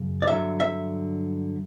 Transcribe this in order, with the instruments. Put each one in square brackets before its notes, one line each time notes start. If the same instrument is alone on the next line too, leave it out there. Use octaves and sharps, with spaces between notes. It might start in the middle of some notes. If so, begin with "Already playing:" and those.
Already playing: [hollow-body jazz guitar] F#2 C#3
D5
G2 D3 F#3 E5
E5